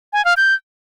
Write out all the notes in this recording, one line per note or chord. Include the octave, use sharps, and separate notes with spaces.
G#5
F5
G6